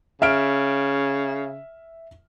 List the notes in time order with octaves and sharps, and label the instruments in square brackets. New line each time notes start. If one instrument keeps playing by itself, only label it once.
[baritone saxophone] C#3 [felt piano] E5 F6 D7